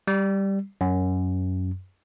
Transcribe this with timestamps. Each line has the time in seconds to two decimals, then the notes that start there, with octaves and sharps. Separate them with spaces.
0.07 G3
0.81 F#2